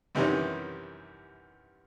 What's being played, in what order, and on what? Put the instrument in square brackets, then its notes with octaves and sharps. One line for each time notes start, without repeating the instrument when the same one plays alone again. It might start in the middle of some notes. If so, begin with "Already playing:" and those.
[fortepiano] F#2 C3 D#3 E3 G3 C#4